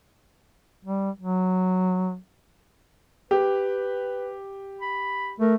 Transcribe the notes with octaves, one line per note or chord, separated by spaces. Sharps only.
G3
F#3
G4 B4
B5
A3 A#4